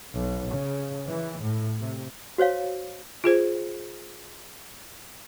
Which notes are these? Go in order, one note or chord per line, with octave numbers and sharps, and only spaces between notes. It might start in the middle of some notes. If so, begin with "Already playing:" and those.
B1
C#3
E3
A2
C3
F#4 C5 C#5 F5
F4 G#4 C5